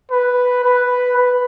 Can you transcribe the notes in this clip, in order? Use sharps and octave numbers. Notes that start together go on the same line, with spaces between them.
B4
B4
B4